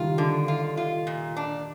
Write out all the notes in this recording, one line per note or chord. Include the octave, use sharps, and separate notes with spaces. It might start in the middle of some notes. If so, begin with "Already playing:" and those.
Already playing: D#3 G3 F4
D3
F4
F4
A#2
D4